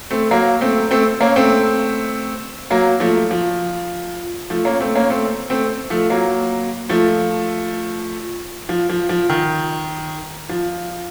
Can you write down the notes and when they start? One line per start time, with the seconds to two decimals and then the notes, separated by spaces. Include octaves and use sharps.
0.11 A3 C4
0.31 F#3 A#3
0.61 A3 C4
0.91 A3 C4
1.21 A#3 C#4
1.36 A3 C4
2.70 F#3 A#3
3.00 F3 A3
3.31 F3
4.50 F3 A3
4.65 A#3 C#4
4.80 A3 C4
4.95 A#3 C#4
5.10 A3 C4
5.50 A3 C4
5.90 F3 A3
6.10 F#3 A#3
6.89 F3 A3
8.69 F3
8.89 F3
9.09 F3
9.29 D#3
10.49 F3